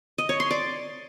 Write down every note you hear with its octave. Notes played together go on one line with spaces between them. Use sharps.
D#5
C#5
C6
D5